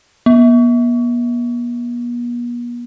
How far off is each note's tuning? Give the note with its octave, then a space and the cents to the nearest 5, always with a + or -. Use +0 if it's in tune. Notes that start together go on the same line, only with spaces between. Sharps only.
B3 -45